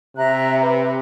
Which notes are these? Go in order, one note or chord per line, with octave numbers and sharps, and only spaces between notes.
C3 E5 A#5 F#6
B4